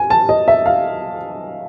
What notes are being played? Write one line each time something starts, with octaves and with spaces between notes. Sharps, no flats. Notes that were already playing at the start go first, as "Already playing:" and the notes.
Already playing: G#5
A5
D#5
E5
F5